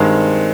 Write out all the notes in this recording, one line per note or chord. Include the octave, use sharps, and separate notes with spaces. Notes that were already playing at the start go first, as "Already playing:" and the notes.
Already playing: G2 D#3 G#3 C4